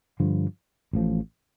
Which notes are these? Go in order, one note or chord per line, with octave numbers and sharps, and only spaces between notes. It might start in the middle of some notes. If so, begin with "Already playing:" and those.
G2 D3 F3
A1 A2 F3